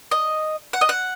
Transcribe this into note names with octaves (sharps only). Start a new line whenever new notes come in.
D#5
F#5
D#5
F#5